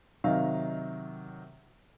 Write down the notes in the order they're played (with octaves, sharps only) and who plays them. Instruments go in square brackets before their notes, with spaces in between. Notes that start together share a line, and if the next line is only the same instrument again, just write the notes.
[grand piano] C3 D#3 F#3 D#5 F5